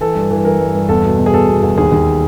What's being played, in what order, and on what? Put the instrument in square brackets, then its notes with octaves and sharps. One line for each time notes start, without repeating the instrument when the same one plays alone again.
[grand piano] E3 A4
G2
E3
E3 A#4
G2
G2
E2 A4
B2
B2
G#4
E2 A4
B2
E2
D#2 G#4
D#2